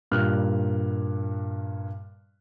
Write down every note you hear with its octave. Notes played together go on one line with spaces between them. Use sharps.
G2 A#2 G3 F6 F#6